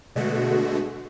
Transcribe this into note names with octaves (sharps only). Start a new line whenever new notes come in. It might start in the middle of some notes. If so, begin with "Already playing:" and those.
B2 D3 G#3 A3 F#4